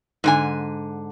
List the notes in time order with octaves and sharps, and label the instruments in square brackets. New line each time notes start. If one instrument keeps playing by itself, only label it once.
[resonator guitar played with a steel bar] G#2 D3 G#5